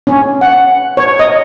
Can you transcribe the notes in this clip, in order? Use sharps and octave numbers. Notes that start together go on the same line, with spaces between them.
C#4
F#5
C#5
D#5